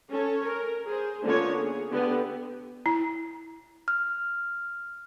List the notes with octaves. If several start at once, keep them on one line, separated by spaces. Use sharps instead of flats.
C#4 A4 C#5
A#4
G#4 C5
D3 A#3 B3 C#4 F4 C#5
G#4
D3 B3 G4
E4
F6